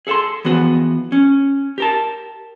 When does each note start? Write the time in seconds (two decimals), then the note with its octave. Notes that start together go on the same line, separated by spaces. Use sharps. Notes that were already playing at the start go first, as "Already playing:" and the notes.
0.07 G#4 A4 F#5 A5 C6
0.45 E3 F3 B3 F#4 G#4
1.12 C#4
1.78 G4 A#4 A5